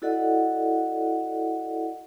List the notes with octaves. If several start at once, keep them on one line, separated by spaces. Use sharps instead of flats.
E4 F#4 A4 D5 D#5 F#5